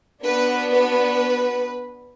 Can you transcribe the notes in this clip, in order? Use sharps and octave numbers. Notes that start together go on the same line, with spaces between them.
B3 D4 F#4 B4
B4